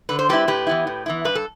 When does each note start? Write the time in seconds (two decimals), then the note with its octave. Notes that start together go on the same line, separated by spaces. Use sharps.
0.09 D3 B4
0.19 C5
0.29 G3 C4 E4 G4 B4
0.48 A2 G4 B4
0.67 E3 B3 E4
0.87 A2
1.06 E3 B3 E4
1.25 G2 B4
1.35 A4